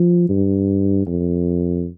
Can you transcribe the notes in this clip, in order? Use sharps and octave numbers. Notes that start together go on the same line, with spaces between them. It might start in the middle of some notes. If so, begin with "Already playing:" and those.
Already playing: F3
G2
F2